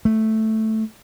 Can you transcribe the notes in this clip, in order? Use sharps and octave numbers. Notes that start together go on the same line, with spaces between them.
A3